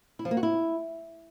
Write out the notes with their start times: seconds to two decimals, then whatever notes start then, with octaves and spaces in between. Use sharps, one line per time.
0.19 E4
0.25 F3
0.31 A#3
0.37 F#4
0.43 E4